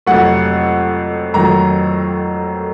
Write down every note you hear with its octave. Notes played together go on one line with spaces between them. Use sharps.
F2 C3 F#3 A3 F#5
F2 D#3 F#3 A3 A#5